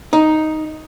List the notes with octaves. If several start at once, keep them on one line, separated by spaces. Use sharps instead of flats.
D#4